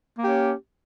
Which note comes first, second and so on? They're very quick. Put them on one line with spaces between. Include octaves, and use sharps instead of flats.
A#3 G4 C#4